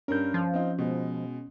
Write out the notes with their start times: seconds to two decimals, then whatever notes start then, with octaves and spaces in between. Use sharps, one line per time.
0.08 G2 C#4 A#4 G6
0.34 F3
0.54 C4 D#4 F4
0.78 B2 G#3